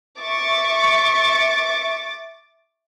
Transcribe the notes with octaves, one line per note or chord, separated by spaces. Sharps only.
E5 C#6 D6 A6